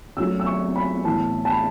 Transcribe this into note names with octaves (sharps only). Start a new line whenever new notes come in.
C#3 F#3 A3 E6
E6
C#6
B5
A2 E3 B3 E4 A5
A5
B5